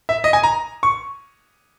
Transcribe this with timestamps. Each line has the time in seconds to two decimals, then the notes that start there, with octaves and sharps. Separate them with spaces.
0.09 E5
0.24 D#5
0.33 G#5
0.43 A#5
0.83 C#6